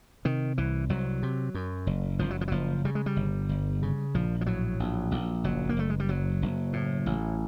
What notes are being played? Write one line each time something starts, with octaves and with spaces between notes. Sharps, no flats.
C3 D#3
C2 E3
C2 F#3
C3
F#2
F#1
F#1 F3
F#3
F3
F#3
F#1 F3
C#3 G3
G#3
G3
G1
G1
C#3
A#1 F3
F3
A2 F#3
A#1
A#1
F#1 F#3
A#3
F#1 A3
G#3
G3
F#1 F#3
F#1
A2
A1